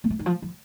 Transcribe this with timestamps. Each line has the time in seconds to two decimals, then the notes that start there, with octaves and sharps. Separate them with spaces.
0.04 A#3
0.10 A3
0.19 D#3
0.26 F3
0.42 F3